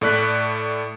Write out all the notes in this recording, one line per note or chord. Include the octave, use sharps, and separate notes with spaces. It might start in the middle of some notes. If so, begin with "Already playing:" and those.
A2 A3 D5 F#6 B6